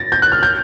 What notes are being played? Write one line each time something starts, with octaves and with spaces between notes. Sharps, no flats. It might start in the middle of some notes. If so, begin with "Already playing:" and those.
Already playing: A6 A#6
G6
F#6
F6
G6